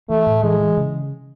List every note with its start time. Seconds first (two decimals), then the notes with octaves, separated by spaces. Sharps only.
0.10 E3 A3
0.27 A2
0.43 E3 G#3
0.61 E3
0.77 C#3